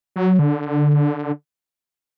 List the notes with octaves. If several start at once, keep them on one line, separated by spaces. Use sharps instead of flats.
F#3
D3